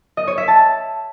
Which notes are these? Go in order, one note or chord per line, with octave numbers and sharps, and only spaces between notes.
D#5
C#5
E5
A5